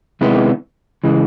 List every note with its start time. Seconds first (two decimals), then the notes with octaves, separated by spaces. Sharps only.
0.21 C3 D#3 G#3 B3 E4
1.04 C#3 E3 G#3